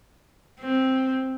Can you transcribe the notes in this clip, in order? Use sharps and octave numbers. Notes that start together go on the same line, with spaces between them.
C4